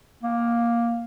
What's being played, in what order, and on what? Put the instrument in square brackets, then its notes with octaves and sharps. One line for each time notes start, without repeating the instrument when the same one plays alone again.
[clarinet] A#3